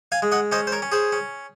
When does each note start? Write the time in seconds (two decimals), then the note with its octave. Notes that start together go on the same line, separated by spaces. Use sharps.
0.12 F5 G#5
0.22 G#3
0.32 D#5 F#5
0.52 C#4 C5 D#5
0.67 C5
0.72 A#4 C#5
0.82 C#4
0.92 G#4 C5
1.12 C#4